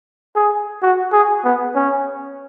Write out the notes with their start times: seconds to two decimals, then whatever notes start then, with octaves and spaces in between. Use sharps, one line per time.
0.35 G#4
0.82 F#4
1.12 G#4
1.44 B3
1.75 C#4